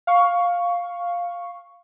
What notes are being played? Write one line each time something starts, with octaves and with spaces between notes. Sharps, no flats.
F5 C#6